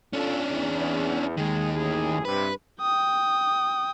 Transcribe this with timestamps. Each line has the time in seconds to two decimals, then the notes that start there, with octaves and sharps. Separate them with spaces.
0.13 C#4 D4 F4 A4
0.48 E2
1.37 D#2 D#3 G#3 G#4
1.73 A1 A2 G#4
2.25 G2 C3 B4
2.82 G5 D#6